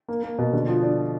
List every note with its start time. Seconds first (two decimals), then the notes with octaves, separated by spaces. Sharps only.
0.08 A#3
0.23 A#3
0.38 B2
0.53 D3
0.68 F3
0.83 D4